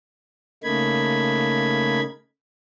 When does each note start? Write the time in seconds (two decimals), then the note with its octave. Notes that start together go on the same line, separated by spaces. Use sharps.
0.63 C#3 A3 A#3 D#4 B5 G#6